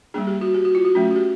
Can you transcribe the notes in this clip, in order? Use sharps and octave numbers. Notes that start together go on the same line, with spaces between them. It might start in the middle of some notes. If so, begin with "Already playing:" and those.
G3 A#3 D4 G#4
G4
F#4
G4
F#4
F4
F#4
F#3 A3 C#4
F#4
G4